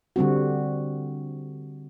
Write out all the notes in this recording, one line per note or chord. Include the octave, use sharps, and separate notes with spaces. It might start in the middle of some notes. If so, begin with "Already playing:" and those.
D3 G3 C4 F#4